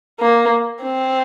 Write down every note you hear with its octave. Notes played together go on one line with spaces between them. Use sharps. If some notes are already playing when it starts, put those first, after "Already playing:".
A#3
C4